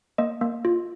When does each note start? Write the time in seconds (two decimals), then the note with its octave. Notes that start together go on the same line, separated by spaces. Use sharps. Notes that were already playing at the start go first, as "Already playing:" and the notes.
0.18 A#3 D#5
0.41 A#3
0.65 F4